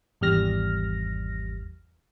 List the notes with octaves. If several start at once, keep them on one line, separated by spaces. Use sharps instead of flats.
G#1 E2 G3 F6 A#6